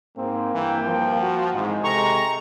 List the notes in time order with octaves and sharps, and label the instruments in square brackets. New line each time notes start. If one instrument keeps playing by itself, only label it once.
[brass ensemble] G#2 [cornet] A#3 [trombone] C4
[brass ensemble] G2 C4 G5 [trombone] E3
[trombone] F3
[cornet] F#4
[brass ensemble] G#1 D2 E3 [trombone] G#2 [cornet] G#3
[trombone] C3 [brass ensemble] A4 G5 [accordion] A#5 C#6